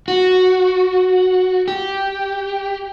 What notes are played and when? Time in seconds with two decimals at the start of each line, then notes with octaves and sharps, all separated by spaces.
0.08 F#4
1.68 G4